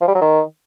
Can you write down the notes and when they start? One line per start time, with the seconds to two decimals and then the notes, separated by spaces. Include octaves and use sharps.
0.02 F3
0.08 G3
0.15 F#3
0.22 D#3